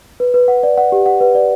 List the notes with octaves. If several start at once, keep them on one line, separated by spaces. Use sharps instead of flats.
B4
B4
F#5
D5
F#5
G4
F#5
B4
D5